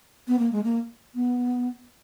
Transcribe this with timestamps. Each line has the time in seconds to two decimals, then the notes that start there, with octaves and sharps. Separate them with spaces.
0.28 B3
0.39 A#3
0.52 G#3
0.64 A#3
1.15 B3